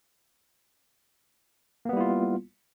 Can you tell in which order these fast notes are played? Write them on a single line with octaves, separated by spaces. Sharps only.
A#3 B3 G3 E4 F4